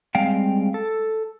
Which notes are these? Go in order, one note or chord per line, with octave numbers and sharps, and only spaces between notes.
G3 G#3 C4 F5 G5
A4